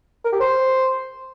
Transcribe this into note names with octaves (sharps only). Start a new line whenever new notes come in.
A#4
G4
C5